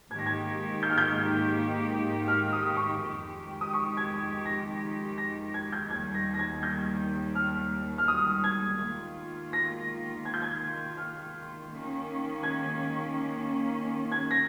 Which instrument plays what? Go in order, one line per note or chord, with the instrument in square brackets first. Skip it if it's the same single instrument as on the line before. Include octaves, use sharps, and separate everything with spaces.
[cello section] G#2 D#3 A#3 D#4 G4 [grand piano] G#6
[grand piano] A#6
G#6
G6
F6
G6
F6
D#6
C#6
[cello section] F2 D#3 G#3 D#4 G4
[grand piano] D#6
C#6
G#6
A#6
A#6
G#6
G6
[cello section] D#2 D#3 G3 [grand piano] G#6
[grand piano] A#6
A#6
G#6
G6
F6
F6
D#6
G#6
[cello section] D#3 A#3 F4
[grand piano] A#6
G#6
G6
G#6
F6
[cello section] D#3 A#3 C#4
[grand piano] G#6
G#6
A#6